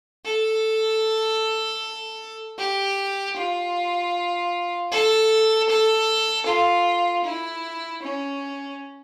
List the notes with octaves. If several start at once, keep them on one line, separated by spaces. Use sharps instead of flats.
A4
G4
F4
A4
A4
F4
E4
C#4